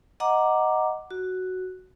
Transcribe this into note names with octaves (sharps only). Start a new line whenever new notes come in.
D#5 F#5 A#5 D6
F#4